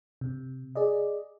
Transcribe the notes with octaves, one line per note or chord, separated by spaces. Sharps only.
C3
G#4 D5 D#5